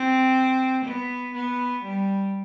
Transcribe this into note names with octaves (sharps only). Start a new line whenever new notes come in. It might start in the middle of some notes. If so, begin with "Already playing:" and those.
Already playing: C4
B3
B3
G3